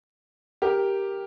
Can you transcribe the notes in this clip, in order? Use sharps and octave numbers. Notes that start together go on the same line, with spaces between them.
G4 A#4